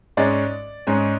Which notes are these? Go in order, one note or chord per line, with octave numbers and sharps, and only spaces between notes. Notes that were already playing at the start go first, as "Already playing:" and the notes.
G#2 G#3 C#4 D5
G#2 G#3 C#4